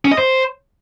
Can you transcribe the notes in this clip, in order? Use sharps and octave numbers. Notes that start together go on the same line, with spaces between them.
C#4
D#5
C5